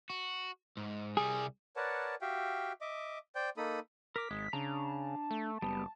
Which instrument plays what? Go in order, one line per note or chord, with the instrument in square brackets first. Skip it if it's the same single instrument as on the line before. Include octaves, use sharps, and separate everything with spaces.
[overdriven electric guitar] F#4
G#2
[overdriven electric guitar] C2 G3 [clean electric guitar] G#4
[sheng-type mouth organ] A#4 B4 C#5 D5 F#5 A5
F#4 G4 E5 F5 G5
D#5 E5 D6
C5 D5 G5 G6
A#3 D#4 A4 B5 D#6
[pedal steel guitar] A#4 D6 [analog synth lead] B6
[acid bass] G#1 [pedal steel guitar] G#3
[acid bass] C#3 [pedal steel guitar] D4 A#5 [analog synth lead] A5
[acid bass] A3
[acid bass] F#1 [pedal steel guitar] G3 B3 [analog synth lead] A5